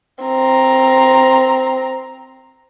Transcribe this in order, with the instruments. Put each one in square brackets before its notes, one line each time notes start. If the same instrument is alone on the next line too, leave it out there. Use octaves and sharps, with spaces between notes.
[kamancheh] C4 A#5